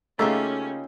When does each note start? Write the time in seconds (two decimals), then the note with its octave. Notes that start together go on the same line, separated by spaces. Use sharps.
0.19 C#3 A3 A#3 C#4 D#4 F4 G4 E6